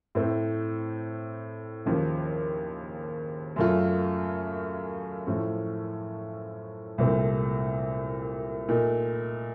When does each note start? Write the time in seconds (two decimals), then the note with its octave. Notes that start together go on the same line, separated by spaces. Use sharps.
0.15 A2 A3 C4
1.86 D#2 C#3 F3
3.56 F#2 C#3 A3 C#4 F4
5.27 A2 F3 A3 C#4
6.98 C2 A#2 A3 C4
8.68 A#2 A3 D#4